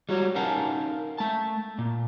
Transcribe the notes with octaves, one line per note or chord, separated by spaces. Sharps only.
G3 F#4 C#5
C#4 D#4 A#4 F5 F#5 A5
A3 A5
A#2